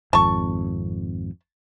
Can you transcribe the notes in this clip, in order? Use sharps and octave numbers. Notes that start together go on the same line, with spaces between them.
G#1 F2 A5 C#6